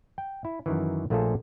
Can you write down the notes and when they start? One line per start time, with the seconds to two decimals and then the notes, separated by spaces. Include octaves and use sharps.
0.18 G5
0.45 E4
0.66 F#2 D#3 E3
1.10 A#1 A3 A#3 F4 G#4 A4